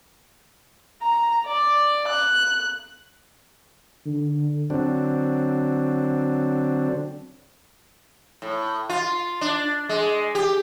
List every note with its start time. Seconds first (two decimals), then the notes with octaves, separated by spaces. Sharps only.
1.02 A#5
1.47 D5
2.08 F#6
4.06 D3
4.70 D3 F#3 C4 D4
8.42 A2
8.89 F4
9.41 D4
9.89 G#3
10.35 G4